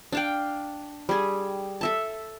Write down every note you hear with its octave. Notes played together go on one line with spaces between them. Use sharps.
D4 F5 G5
G3 G#4
A4 E5 A5